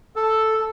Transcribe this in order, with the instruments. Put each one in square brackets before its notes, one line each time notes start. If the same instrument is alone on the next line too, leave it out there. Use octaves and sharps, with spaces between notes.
[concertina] A4